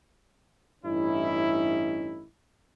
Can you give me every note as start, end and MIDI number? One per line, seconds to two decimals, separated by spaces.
0.85 2.24 33
0.85 2.24 43
0.85 2.24 61
0.85 2.24 63
0.85 2.24 64